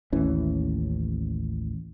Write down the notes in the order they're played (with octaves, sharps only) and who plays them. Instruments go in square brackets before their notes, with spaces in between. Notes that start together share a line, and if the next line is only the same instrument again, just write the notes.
[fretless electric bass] A1 D#2 E3 C#4